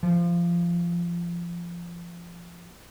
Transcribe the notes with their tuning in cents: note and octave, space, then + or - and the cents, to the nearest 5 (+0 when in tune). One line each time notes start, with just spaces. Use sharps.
F3 -20